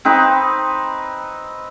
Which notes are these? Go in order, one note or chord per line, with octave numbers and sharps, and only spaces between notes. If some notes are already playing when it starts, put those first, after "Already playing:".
C4 D#4 B4